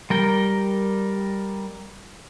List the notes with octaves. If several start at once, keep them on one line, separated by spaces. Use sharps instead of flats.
G3 A#4 G5